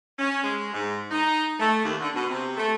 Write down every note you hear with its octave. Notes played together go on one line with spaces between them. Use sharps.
C#4
G#3
G#2
D#4
A3
D#2
D3
B2
C3
A3